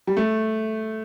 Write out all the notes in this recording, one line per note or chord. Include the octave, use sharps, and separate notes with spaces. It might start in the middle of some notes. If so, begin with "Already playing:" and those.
G3
A3